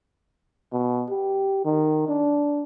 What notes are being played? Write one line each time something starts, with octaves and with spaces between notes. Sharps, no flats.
B2
G4
D#3
D4